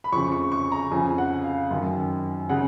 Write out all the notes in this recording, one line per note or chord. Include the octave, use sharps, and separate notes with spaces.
B5
F2 C#3 C#6
C#6
C#6
A#5
F2 C#3 G#5
F#5
F5
F#2 D#3
C#3 F#5